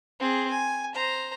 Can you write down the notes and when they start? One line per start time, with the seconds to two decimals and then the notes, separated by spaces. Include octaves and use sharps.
0.20 C4 G#4
0.51 G#5
0.95 C5 A#5